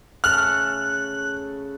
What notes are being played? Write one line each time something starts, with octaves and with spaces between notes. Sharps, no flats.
C#3 A3 A4 F6 F#6